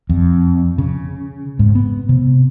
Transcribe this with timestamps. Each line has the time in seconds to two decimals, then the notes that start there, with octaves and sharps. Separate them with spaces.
0.09 F2
0.78 C#3
1.59 G#2
1.75 B3
2.09 C3